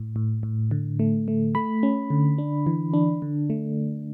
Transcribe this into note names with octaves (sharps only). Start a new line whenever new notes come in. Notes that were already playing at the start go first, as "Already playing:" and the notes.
Already playing: A2
A2
A2
D3
A3
A3
A3 B5
C#4
D3
D4
E3
D4
D3
A3